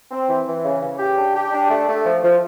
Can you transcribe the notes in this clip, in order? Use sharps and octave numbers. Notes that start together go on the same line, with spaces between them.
C4
E3
E3
C#3
C#3
G4
D4
G4
D4
A3
A3
F3
F3